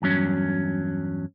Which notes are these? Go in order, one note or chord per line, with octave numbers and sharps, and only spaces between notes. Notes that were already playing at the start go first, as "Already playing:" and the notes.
E2 G2 F#3 C#4